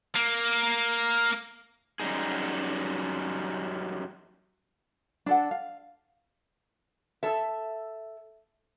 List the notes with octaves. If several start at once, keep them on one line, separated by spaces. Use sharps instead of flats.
A#3
F#2 G3 D#4 G#4
D4 A4 F#5
F5
A4 E5